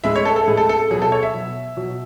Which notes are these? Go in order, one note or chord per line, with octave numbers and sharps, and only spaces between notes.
A2 G#3 E5
C#5
A4
A4
A2 G#3 G#4
A4
A4
B2 F#3 G#4
A4
C#5
E5
B2 F#3
B2 F#3